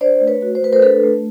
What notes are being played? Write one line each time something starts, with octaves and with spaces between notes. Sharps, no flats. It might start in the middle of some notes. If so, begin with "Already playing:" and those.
D4 C5 D5
A3
B4 C#5
F#4
C5
A3 B4
A#4 C5
D4 A4 B4
A3